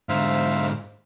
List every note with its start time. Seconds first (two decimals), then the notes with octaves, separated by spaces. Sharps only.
0.09 G#2 D3 C5 E5 F5